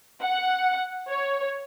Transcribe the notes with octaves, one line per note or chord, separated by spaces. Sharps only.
F#5
C#5